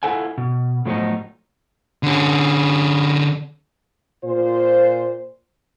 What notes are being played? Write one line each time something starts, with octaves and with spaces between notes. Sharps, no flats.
E4 F4 A4 F#5 G#5
B2
A2 F3 F#3 A3 B3 D#4
D3 C#4
A#2 F4 C5